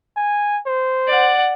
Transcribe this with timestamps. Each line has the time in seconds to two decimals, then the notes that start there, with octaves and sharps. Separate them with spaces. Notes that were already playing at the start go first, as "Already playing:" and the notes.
0.17 G#5
0.66 C5
1.08 D5 F#5